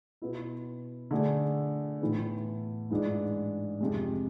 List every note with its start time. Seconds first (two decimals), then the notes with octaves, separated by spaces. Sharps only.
0.22 B2 B3 E4
1.11 D3 A3 D4 G#4
2.01 A2 E3 B3
2.90 G#2 E3 G#3 D4
3.80 F2 C3 G#3